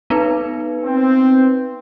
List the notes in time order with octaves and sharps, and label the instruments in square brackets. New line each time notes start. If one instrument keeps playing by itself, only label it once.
[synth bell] B3 D#4 B4
[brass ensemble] C4